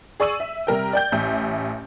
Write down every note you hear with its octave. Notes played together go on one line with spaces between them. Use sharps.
G#4 D5 C#6 E6 D#7 F#7
E5
C3 G3 A#4 G5
D5 G5 G6
A1 E5